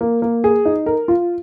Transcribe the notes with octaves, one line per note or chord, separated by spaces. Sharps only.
A#3
A#3
G#4
D#4
A#4
F4